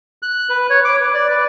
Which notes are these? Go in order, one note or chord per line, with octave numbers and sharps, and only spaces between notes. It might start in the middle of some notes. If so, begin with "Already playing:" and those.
F#6
B4
C#5
D6
B4
D5
B4